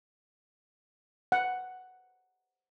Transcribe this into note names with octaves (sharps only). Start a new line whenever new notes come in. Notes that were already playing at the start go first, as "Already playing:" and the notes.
F#5